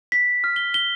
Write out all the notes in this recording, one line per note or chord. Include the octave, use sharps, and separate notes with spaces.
B6
F6
G7
G7